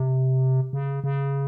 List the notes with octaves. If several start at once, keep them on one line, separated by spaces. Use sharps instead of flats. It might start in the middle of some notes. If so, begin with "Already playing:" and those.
Already playing: C3
C#3
C#3